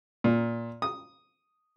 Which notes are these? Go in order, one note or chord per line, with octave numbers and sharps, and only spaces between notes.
A#2
D#6